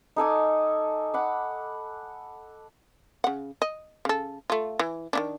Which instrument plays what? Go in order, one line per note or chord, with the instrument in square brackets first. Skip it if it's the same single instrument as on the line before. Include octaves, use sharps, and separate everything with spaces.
[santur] D#4 A4 G#5 D6
F#5 B5 D6
[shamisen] C#3 F#5
D#5
C#3 A4
A3 F4
E3
D#3 C#4 D4